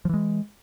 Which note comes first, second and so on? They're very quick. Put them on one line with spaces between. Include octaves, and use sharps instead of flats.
F3 E3 G#3